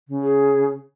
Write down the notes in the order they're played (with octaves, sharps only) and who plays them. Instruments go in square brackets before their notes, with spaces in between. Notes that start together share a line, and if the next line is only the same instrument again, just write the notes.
[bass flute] C#3
[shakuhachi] G#4